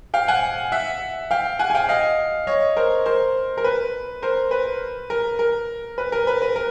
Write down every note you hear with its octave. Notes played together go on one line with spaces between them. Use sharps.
F5 G5
F#5 G#5
E5 F#5
F5 G5
F#5 G#5
G#5
F5 G5
D#5 F5
C#5 D#5
A#4 C5
A#4 C5
A#4
B4
A#4 C5
B4
A#4
A#4
B4
A#4
B4
B4
A#4